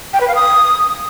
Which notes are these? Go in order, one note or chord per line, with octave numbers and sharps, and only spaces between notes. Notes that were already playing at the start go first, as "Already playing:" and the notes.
G5
B4
F5
D#6